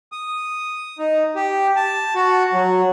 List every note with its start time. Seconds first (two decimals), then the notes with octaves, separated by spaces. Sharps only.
0.12 D#6
0.99 D#4
1.36 G4
1.76 A5
2.15 F#4
2.53 F#3